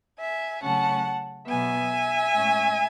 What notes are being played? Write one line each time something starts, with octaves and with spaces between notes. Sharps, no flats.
E5 G#5
C#3 F#3 A3 C#4 F#5 A5
B2 F#3 B3 E5 G#5
A2 G#3 C#4